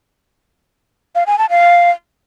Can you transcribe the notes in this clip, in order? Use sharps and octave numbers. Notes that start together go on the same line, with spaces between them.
F5
G#5
A5
F5